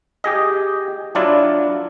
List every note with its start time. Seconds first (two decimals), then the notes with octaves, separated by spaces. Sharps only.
0.24 G4 G#4 D#5
1.15 F#3 D4 E4 F4 D5